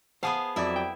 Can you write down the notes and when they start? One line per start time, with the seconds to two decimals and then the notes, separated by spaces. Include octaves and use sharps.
0.23 B3 G#4 C5 F5 F#5 A5
0.56 F2 F#3 E4 D5 E5
0.76 G5